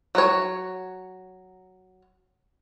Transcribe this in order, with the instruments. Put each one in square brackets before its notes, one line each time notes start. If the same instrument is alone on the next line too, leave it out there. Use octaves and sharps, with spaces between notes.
[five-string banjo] F#3 F#4 C#5